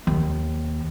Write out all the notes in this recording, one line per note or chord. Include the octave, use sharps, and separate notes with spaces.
D#2